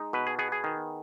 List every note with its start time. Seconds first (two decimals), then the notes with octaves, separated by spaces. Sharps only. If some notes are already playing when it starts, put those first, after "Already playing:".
Already playing: G#3 D#4
0.13 B2 B4
0.27 G#4
0.39 B3 G#4
0.52 G#4
0.64 D#3